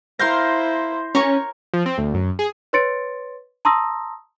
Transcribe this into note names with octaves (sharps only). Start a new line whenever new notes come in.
E4 A#4 C5 F5 C6 G6 A#6
C#4 A#4 C#5 C#6
F3
C4
D2
F#2
G#4
B4 C#5 C6 A6 C#7 D7
A5 A#5 C6 D#6 E6 A#6